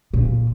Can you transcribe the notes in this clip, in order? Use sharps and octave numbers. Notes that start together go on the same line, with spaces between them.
A#2